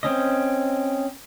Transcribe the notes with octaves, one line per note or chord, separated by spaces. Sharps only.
C4 C#4 D#5